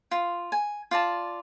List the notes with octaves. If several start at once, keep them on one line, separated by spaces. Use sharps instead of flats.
F4
G#5
F4 D5 A5